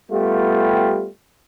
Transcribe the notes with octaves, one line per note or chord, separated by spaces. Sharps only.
G3 A3 B3 F4 G4